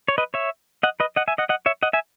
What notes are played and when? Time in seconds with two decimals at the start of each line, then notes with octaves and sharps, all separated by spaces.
0.08 C#5
0.18 B4 D#5
0.34 C#5 E5
0.83 D#5 F#5
1.00 B4 D#5
1.16 D#5 F#5
1.28 E5 G#5
1.38 D#5 F#5
1.49 D#5 F#5
1.66 C#5 E5
1.83 D#5 F#5
1.93 E5 G#5